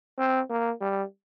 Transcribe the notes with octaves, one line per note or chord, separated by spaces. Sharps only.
C4
A#3
G3